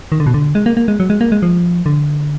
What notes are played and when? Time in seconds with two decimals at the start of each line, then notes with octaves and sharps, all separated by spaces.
0.12 D#3
0.20 D3
0.27 B2
0.34 D3
0.55 G#3
0.66 A#3
0.77 A#3
0.88 G#3
1.00 F#3
1.10 G#3
1.21 A#3
1.32 G#3
1.42 F3
1.86 D3